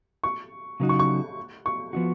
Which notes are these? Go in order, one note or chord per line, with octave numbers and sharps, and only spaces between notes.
C#6
C#3 F#3 A#3 D#4 F#4
C#6
C#6
C#6
F3 B3 D#4 F#4